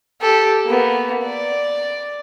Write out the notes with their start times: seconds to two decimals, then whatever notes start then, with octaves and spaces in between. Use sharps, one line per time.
0.21 G4 A4
0.66 A#3 B3
1.24 D5